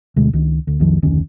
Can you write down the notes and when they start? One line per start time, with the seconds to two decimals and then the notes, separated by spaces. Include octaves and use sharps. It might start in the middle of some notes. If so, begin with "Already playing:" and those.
0.16 D2 B2 G#3
0.33 C#2 D#3
0.67 D2
0.79 B1 F2 D#3 F3
1.02 F1 D2 D#3 C#4